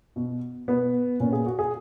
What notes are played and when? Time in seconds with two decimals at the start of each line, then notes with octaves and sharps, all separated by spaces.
0.16 B2
0.68 B2 B3
1.20 A#2 C#4
1.33 G#4
1.46 F#4
1.59 G#4